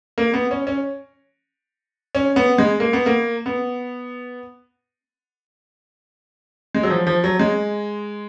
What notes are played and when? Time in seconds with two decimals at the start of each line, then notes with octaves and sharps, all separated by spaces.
0.18 A#3
0.34 B3
0.51 C#4
0.67 C#4
2.15 C#4
2.36 B3
2.58 G#3
2.80 A#3
2.93 B3
3.06 A#3
3.46 B3
6.75 G#3
6.83 F#3
6.90 F3
7.07 F3
7.24 F#3
7.39 G#3